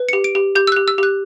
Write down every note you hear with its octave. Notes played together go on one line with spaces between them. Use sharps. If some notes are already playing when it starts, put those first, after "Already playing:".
Already playing: B4
G4 C#7
D7
G4
G4 G6
E6
G4 F#6
E6
G4 F#6